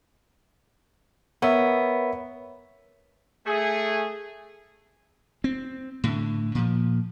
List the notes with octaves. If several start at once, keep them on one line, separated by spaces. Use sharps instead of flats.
B3 A#4 C#5 E5
A3 G#4
C4
A2 D3
A#2 F3